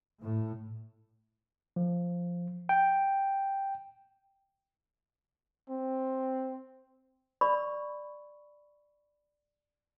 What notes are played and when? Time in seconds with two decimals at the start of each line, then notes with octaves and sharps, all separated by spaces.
0.21 A2
1.76 F3
2.69 G5
5.70 C4
7.41 D5 B5 C#6